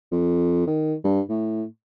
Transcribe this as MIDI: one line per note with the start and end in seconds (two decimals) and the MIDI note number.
0.12 0.65 41
0.67 0.94 51
1.04 1.21 43
1.29 1.64 45